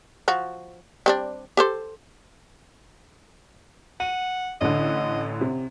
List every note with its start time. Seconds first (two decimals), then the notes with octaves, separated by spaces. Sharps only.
0.28 F3 F#4
1.06 G3 C4 D4
1.57 G4 A4 C5
4.00 F#5 D#7
4.61 A1 D3 D#5
5.41 C3